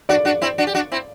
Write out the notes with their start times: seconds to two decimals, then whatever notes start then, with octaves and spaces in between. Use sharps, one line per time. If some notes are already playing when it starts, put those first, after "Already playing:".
0.09 D4 F#4 D5
0.25 D4 F#4
0.42 C4 E4
0.58 D4 F#4
0.67 G4
0.75 D4 F#4
0.92 C4 E4